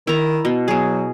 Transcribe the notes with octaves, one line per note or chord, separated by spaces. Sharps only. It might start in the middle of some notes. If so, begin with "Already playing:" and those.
D#3 E4 A#5
B2
B2 F#3 G#4